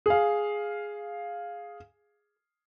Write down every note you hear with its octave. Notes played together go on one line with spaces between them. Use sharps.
G#4 F5